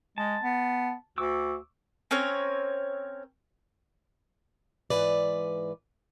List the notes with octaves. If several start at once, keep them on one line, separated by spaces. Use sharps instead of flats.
G#3 A5
B3
D2 C#6 D6 E6
C4 C#4 A#4 C#5
G#2 C3 E3 B4 D5